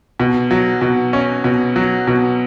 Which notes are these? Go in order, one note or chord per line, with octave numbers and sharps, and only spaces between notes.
B2
F#3
B2
C#4
B2
F#3
B2